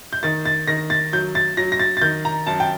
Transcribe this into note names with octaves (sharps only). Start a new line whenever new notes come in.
G6
D#3 A6
A6
D#3 A#6
A6
F#3 G6
A6
F#3 A#6
A#6
A6
A6
D#3 G6
A#5
F#2 A5
G5